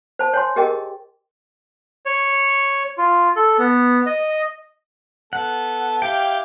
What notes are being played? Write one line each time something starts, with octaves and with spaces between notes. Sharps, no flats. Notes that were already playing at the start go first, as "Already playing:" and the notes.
C5 A5
C#5 G#5 C6
G4 G#4 A#4 D#5 G5
C#5
F4
A4
B3
D#5
B3 A4 F#5
E4 G4 F5 G5